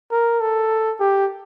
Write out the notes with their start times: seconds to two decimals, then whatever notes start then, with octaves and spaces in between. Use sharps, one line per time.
0.11 A#4
0.41 A4
1.00 G4